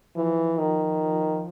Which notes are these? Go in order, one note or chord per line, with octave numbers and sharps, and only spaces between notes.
E3 F3
D#3